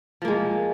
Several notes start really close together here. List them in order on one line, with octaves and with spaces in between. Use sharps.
F3 A#3 G#3